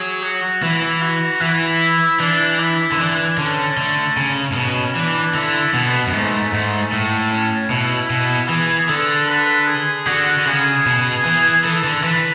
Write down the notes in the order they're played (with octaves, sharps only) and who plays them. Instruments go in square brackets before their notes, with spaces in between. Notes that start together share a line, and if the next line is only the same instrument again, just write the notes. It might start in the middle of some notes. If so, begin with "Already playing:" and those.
Already playing: [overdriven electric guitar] F#3 [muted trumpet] G#4
[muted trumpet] F#4
[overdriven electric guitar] E3 [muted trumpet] E4
[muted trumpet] F#4
[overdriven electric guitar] E3 [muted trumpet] E4
[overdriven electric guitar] E3 [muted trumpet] D4
[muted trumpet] E4
[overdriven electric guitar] D3
[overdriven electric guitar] E3 [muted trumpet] D4
[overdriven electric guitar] D3 [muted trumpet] C#4
[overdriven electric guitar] D3 [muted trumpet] A3
[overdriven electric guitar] C#3
A2
[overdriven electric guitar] B2 [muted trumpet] C#4
[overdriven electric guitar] E3 [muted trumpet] D4
[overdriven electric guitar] D3 [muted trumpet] E4
[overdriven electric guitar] B2 [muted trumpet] B3
[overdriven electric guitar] F#2
[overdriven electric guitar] G#2 [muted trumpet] A3
[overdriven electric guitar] G#2 [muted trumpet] A3
[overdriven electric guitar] A2 [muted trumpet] A3
[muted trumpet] C#4
[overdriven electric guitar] B2 [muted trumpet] E4
[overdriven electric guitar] B2
[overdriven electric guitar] E3 [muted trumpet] G#4
[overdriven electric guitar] D3 [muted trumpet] A4
[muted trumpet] B4
G#4
[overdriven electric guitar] D3 [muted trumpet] F#4
[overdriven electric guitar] D3
[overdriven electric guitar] C#3 [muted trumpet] G#4
[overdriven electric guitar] B2
E3
[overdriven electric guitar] E3 [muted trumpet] A4
[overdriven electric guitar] D3
[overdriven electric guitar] E3 [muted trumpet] B4